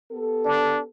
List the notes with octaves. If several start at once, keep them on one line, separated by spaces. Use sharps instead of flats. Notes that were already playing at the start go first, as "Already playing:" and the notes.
B3 G4 A4
D4